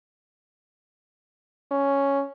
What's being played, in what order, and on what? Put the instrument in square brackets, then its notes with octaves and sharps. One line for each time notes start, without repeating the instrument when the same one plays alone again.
[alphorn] C#4